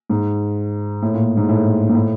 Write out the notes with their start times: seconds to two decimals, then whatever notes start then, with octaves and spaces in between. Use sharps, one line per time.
0.10 G#2
1.02 A2
1.14 A#2
1.37 G#2
1.49 A2
1.89 G#2
1.94 A2